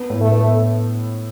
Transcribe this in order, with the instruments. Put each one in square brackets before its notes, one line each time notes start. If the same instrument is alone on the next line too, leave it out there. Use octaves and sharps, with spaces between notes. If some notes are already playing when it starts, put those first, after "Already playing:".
Already playing: [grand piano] B3
A2
[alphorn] A3
[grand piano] B3